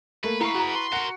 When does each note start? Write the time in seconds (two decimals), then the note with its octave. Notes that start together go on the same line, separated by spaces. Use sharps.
0.24 A3 A#3 B4
0.41 B3 E4 F5 A#5 C#6
0.55 F#4 G#4 F#5 A#5
0.75 A5 C6
0.92 F#4 A#4 F#5 C#7